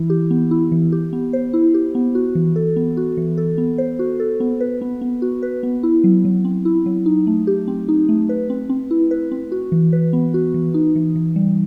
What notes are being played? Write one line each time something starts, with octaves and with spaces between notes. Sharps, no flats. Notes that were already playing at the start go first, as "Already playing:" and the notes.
Already playing: E3 E4
G4
B3
E4
E3
G4
B3
C5
E4
G4
B3
F#4
E3
A4
B3
F#4
E3
A4
B3
C5
F#4
A4
B3
B4
B3
B3
F#4
B4
B3
E4
F#3
F#3
C4
E4
F#3
D#4
A3
G4
C4
D#4
A3
B4
C4
C4
E4
B4
C4
F#4
E3
B4
B3
F#4
E3
D#4
E3
E3
G3